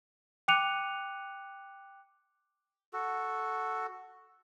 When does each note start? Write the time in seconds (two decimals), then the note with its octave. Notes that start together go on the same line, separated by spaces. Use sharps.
0.48 G5 D6 F#6 C#7 D#7 F7
2.93 F#4 A4